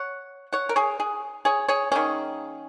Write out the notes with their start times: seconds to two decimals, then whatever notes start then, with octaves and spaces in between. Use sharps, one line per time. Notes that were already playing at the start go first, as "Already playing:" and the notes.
Already playing: C#5 F#5
0.53 C#5 F#5
0.69 A#4
0.76 G#4 C#5
1.00 G#4
1.45 G#4 C#5
1.68 G#4 C#5
1.92 D#3 A#3 C#4 G#4